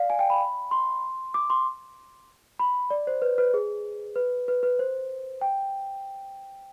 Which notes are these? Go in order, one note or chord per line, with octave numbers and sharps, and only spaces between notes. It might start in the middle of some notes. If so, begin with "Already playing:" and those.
Already playing: D5 F5
G#5
G5
B5
C6
D6
C6
B5
D5
C5
B4
B4
G#4
B4
B4
B4
C5
G5